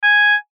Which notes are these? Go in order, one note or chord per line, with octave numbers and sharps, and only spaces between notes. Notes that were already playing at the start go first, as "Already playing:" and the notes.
G#5